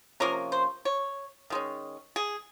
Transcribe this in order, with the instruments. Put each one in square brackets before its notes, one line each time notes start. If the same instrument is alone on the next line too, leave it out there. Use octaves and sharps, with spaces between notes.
[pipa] C3 F3 A#3 C#4 A#4
C5
C#5
D#3 G#3 C#4
G#4